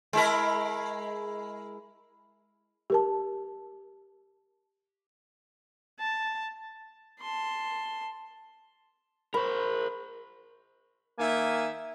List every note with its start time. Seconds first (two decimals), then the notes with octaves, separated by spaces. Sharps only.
0.13 G#3 E4 A#4
2.90 G4 A#4 A5
6.00 A5
7.20 A5 C6
9.34 A#4 C5 B5
11.19 D#3 A#3 E5 G#5